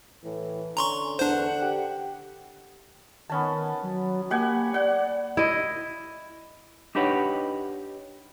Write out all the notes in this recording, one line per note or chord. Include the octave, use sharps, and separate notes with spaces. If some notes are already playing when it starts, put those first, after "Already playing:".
A2 E3
D3 C#4 A#5 C6 C#6
E2 D4 C5 F#5
G4
D#3 B3 C#4 A5
F#3
A#3 G4 F#5 G#5
D5 F#5
E4 D#5
D4 D#4 G4 B4 C#5 F#5